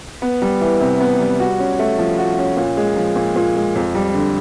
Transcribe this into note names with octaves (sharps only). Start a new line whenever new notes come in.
B3
G3
E3
C3
B3
G3
F#4
C#4
A3
F3
F#4
C#4
A#2
G#3
F3
A#2
A#2
G#3
F2
G3
D3